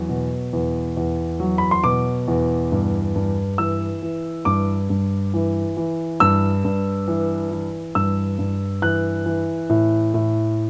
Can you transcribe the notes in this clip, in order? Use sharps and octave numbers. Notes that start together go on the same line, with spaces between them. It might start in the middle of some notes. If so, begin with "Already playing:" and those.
Already playing: E2 F#3
B2
E2
E2
F#3
B5
C6
B2 D6
E2
G2
G2
E3 E6
E3
G2 D6
G2
E3
E3
G2 E6
G2
E3
E3
G2 E6
G2
E3 F#6
E3
A2
A2